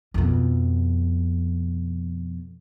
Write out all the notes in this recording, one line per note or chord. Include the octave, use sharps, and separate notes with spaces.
F2 B2